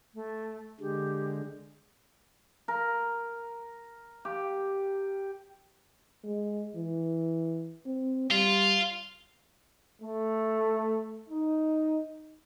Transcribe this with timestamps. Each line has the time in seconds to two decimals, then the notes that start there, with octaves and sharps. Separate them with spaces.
0.14 A3
0.80 D3 G#3 G4
2.68 A#4
4.25 G4
6.24 G#3
6.76 E3
7.86 C4
8.31 G3 F4
10.02 A3
11.30 D#4